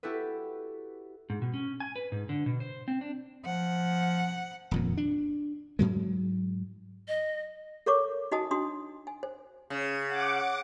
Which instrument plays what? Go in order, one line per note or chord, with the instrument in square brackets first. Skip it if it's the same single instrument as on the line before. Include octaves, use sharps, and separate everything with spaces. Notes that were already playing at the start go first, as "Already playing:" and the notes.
[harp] E4 F#4 G4 A4 B4
[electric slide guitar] G#2
B2
C#4
G#5
B4
G#2
D3
B2
C5
C4
D4
[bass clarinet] F3 [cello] F#5
[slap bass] D#1 F2 A#2
D4
G#2 F#3 G#3
[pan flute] D#5
[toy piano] A4 A#4 C#5 C#6 D6
D#4 F#4 D#5 G#5 A5 D#6
D4 F#4 C6 D#6
G#5
C5
[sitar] C#3
[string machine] F#5 D6